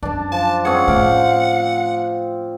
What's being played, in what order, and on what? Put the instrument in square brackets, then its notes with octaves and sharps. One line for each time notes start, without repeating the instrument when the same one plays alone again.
[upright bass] F#2 [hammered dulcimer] D4 A5
[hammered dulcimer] F3 [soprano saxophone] A5
[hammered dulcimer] C4 C#4 G#4 [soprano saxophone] F#5
[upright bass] A2 A3 [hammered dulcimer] F5 G5 D6